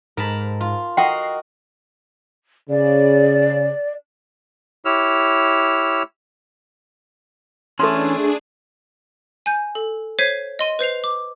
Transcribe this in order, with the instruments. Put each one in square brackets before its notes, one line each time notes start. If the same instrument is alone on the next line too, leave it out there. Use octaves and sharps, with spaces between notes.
[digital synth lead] G#2 [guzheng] A#4 A5 B5
[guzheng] F4
[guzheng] F#4 A#4 D#5 [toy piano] F#5 G5 [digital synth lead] C7
[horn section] C#3 [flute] D5
[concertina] E4 G4 C#5 E6 F6
[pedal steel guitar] E3 C#4 [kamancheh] A3 [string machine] D4 G#4 [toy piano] A4 C6
[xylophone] G#5 G6
A4
C5 C#5 G#6 B6 C7 D#7
D#5 C6 D#7
B4 C5 C7 F7
D6